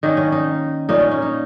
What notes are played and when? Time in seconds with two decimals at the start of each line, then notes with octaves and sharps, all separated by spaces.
0.03 D#3 A#3 C#4 D#4
0.17 C#4
0.32 D#4
0.89 A#2 A#3 C#4 D#4
1.00 C#4
1.11 C#4
1.22 D#4